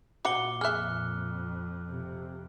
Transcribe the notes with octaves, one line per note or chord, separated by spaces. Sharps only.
A#2 F#4 C5 F#5 D6 C#7 G7
F2 G#4 E5 F6 F#6
C3